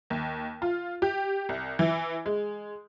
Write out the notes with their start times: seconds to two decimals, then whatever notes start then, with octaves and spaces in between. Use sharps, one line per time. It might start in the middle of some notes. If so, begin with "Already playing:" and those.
0.10 D#2
0.62 F4
1.02 G4
1.49 C2
1.79 E3
2.26 G#3